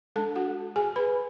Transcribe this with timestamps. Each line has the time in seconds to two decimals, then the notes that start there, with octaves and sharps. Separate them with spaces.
0.16 G#3 D4 A4 A5
0.36 F#4 F#5
0.76 G#4 G#5
0.96 B4 B5